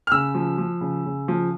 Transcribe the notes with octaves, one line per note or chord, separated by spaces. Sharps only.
F6
C#3 E6
F3
F3
C#3
C#3
F3